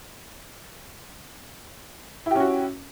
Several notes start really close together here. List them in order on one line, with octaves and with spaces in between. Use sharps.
E4 G4 C#4 F#4